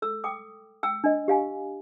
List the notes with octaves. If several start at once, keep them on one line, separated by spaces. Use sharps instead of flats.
A4 E6
G5 D6 D#6
G5 E6
D4 D#5
G4 F5 G#5